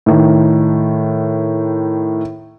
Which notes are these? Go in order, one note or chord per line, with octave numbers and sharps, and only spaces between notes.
A2 D#3